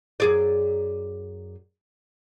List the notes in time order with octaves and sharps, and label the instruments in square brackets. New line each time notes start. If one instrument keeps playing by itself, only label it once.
[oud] F#2 G#4 D5